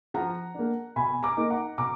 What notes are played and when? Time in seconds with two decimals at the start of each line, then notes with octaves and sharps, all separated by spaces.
0.14 F3 F#5 A#5
0.54 A#3 D4
0.96 B2 G#5 B5
1.23 A#5 D6
1.37 A#3 D#4
1.50 F#5 A#5
1.78 B2 A#5 D6